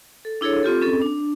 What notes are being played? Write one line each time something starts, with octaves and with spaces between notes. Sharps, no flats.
A4
D4 E4 G#4 A4 C#5
C4 F4 G4 A4
C4 C#4 G#4 A4
D4